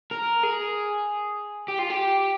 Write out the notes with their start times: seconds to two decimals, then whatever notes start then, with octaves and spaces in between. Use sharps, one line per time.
0.11 A#4
0.43 G#4
1.68 G4
1.79 F4
1.90 G4